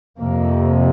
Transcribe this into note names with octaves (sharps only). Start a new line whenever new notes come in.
F2 C3 A#3